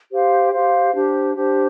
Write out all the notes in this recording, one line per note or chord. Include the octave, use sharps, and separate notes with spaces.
G4 C5 F5
G4 C5 F5
D4 G4 C5
D4 G4 C5